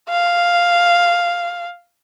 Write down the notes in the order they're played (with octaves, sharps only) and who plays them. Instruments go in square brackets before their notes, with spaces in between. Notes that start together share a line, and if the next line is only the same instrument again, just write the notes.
[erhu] F5